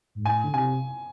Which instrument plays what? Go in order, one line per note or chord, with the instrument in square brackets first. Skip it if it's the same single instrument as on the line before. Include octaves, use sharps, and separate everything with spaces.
[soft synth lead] G#2
[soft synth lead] A2 [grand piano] G#5
[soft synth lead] D3
[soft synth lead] C3 [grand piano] G#5